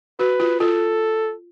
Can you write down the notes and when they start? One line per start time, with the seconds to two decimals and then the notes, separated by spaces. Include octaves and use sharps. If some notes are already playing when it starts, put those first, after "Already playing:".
0.19 F#4 B4
0.40 F4
0.60 F4 A4